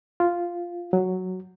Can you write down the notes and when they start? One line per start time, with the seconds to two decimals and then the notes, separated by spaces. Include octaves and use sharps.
0.20 F4
0.93 F#3